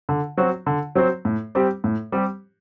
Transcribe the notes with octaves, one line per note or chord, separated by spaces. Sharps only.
D3
F#3 C4 F#4 C5
D3
F#3 C4 F#4 C5
A2
G3 C4 G4
A2
G3 C4 G4